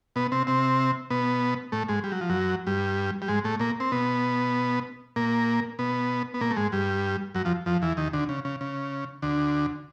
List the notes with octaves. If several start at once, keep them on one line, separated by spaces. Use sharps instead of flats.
B2 B3
C3 C4
C3 C4
B2 B3
A2 A3
G#2 G#3
G3
F#3
F3
F#2 F#3
G2 G3
G3
G#2 G#3
A2 A3
A#2 A#3
C4
B2 B3
A#2 A#3
B2 B3
B3
A#2 A#3
A3
G#2 G#3
G2 G3
F#2 F#3
F2 F3
F2 F3
E2 E3
D#2 D#3
D2 D3
C#3
C#3
C#3
D2 D3